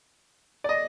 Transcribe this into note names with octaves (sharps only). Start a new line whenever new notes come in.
D5
D#5